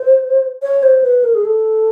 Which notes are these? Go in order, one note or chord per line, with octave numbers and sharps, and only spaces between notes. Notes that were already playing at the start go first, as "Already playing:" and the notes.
Already playing: C5
C#5
C5
B4
A#4
G#4
A4